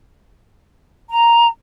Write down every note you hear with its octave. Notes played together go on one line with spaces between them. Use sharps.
A#5